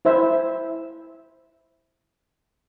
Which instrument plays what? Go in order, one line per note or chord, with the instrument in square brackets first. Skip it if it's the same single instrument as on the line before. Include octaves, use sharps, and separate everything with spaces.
[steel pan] E4 C5 E5